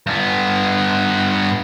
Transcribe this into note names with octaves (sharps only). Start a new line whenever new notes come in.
G2 B3